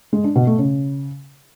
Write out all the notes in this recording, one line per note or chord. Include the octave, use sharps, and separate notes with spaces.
G#3
D4
B2
A3
C#3